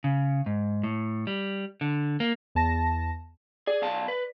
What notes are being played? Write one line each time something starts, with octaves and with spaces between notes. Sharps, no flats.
C#3
G#2
A2
G3
D3
A#3
E2 A5 A#6
G#4 D5
B1 F5 A5
B4